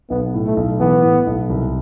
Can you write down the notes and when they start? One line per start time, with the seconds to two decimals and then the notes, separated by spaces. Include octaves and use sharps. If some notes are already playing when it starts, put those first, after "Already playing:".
0.10 B1 B3
0.34 A2
0.46 A3
0.57 B1
0.80 E3 B3
1.03 A2
1.27 B1
1.49 C2